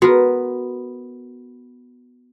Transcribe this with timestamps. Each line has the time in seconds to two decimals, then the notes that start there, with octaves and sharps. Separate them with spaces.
0.02 B3 F#4 A#4